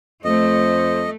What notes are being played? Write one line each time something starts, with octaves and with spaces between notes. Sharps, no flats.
F2 A3 C5 D#5